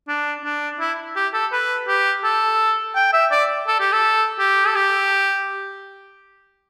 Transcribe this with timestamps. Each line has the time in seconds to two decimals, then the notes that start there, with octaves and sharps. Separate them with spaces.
0.08 D4
0.44 D4
0.80 E4
1.16 G4
1.33 A4
1.52 B4
1.88 G4
2.24 A4
2.96 G5
3.13 E5
3.31 D5
3.68 A4
3.80 G4
3.92 A4
4.39 G4
4.67 A4
4.75 G4